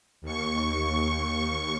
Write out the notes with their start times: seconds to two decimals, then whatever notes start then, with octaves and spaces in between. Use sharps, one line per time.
0.22 D#2 C#6